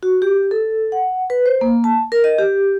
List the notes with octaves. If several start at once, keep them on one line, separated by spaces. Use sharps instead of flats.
F#4
G4
A4
F#5
B4
C5
A#3
A5
A#4
D#5
G4